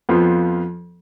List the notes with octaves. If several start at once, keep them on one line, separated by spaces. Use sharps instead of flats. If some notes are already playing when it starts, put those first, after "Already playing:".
F2 F3 B3 F4